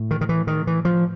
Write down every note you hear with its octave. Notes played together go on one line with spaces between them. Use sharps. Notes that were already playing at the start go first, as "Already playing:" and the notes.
Already playing: A2
D#3
D#3
E3
D#3
E3
F3